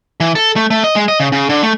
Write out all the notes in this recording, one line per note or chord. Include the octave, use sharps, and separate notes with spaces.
E3
A4
A3
A3
D#5
G#3
D#5
C#3
C#3
D3
A3